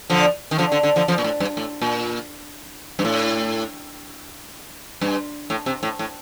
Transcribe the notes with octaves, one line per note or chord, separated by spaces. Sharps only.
D3 F3
D#3
D3 F3
D3
D3
D3 F3
D3 F3
A#2
A2
G2
A2
A#2
G2
A2
G2
A2
C3
A2
A2